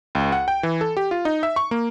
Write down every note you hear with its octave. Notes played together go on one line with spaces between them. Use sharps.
C#2
F#5
G5
E3
A4
G4
F4
D#4
E5
C#6
A#3